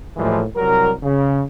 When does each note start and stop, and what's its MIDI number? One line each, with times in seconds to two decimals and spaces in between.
0.17 0.41 45
0.17 0.41 52
0.17 0.41 53
0.17 0.41 55
0.17 0.41 56
0.17 0.41 58
0.57 0.92 36
0.57 0.92 54
0.57 0.92 55
0.57 0.92 70
1.03 1.42 49